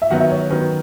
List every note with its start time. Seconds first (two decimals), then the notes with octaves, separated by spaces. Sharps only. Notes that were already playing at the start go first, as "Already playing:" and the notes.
0.02 E5
0.10 D#3 F#3 B3 F#5
0.20 E5
0.30 C#5
0.50 D#3 F#3 B3 B4